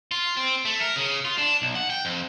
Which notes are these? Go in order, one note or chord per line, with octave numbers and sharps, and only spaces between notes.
F4
C4
A3
A#4
C#3
F4
D4
B1
F#5
G5
F2